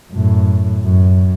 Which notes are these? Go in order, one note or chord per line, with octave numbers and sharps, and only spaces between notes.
F#2 A2
F#2